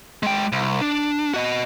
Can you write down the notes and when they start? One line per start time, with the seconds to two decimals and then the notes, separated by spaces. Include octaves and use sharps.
0.23 G#3 G5
0.52 C2
0.81 D4
1.34 F#4 D#5